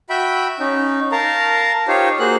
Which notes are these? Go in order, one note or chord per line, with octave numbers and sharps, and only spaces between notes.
F#4 E5 G5 B5
C#4 D#4
A#4 F5 A5 A#5
D#4 F4 G4 C5 C#5
A#3 F#4 G#4 C5 F#6